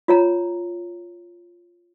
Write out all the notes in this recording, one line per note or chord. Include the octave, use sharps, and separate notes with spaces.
F4 C#5 A#5